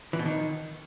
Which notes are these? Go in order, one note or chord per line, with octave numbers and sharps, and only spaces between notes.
E3
B2
D#3